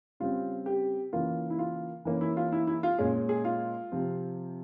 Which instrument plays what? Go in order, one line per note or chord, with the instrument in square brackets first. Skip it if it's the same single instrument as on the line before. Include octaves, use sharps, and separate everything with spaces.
[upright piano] C#3 G3 C4 F4
G4
C#3 E3 A#3 F4
E4
F4
E3 A#3 C#4
E4
F4
E4
E4
F4
A#2 G#3 C#4 G#4
G#4
F4
C3 F3 C4